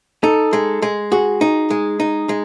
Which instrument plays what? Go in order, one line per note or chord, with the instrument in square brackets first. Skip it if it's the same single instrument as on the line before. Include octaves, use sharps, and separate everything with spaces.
[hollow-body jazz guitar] D#4 [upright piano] A4
[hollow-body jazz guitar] G#3
G#3
[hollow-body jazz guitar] F#4 [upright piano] G#4
[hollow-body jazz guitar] D#4
G#3
D#4
G#3